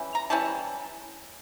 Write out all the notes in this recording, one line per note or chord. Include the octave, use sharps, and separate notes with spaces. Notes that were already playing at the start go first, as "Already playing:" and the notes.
Already playing: E3 G3 C#4 E4
A#5
E3 G3 C#4 E4 A5